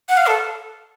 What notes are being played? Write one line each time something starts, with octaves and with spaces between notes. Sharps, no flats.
F#5
F5
A4